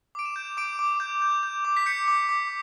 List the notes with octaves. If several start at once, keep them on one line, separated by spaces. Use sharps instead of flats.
D6 D7
E7
G6
D6 D7
D6
G6
G6
G6
D6
B6
G6 C#7
D6
D6